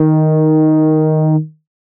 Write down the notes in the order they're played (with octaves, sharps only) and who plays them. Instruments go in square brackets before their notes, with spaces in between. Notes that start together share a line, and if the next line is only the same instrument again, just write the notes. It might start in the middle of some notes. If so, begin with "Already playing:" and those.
Already playing: [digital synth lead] D#3